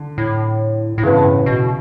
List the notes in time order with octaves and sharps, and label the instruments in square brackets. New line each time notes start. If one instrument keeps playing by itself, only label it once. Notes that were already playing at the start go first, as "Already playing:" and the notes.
Already playing: [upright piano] D3
[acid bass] A2
A2
[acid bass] G2 [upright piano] C#3 E3 B3
[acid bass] A2
B2